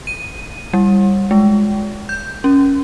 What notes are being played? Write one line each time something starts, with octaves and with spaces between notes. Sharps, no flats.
D#7
G3
G#3
G6
C#4